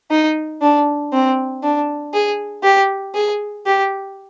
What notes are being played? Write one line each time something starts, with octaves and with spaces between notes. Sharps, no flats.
D#4
D4
C4
D4
G#4
G4
G#4
G4